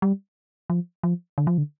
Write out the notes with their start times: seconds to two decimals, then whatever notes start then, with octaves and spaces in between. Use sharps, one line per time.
0.02 G3
0.70 F3
1.03 F3
1.38 D3
1.47 F3
1.58 D3